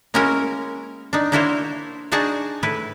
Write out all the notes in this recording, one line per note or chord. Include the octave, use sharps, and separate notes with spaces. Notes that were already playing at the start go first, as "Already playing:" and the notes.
G#3 A#3 C#4 E4 F#4 A#4
D4 D#4
A#3 D4 E4 F#4 C5 C#5
D4 D#4 F#4 G#4 F#5 A5
A2 E4 B4